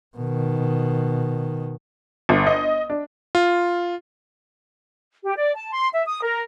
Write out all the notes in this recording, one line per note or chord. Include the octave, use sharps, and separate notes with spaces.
B2 D#3
G1
D#5
D4
F4
G4
D5
A5
C6
E5
D#6
A#4